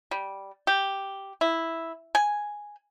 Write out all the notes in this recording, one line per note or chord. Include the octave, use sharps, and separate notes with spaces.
G3
G4
E4
G#5